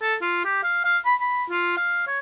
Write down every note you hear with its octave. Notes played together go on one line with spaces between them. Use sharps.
A4
F4
G4
F5
F5
B5
B5
F4
F5
C#5